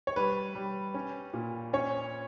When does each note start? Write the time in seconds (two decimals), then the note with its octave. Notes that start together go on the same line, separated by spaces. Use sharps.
0.07 C#5
0.16 G3 B4
0.55 G3
0.94 C#4
1.33 A#2
1.73 C#4 C#5